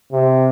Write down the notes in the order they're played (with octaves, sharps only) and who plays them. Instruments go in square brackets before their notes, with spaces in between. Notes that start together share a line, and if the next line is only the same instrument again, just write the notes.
[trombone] C3